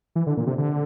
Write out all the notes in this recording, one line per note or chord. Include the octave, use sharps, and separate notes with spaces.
E3
D3
A#2
C3
D3